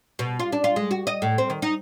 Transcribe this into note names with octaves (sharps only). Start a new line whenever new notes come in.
B2
F4
D4
F4
G#3
F#4
D#5
A2
C4
D#3
D#4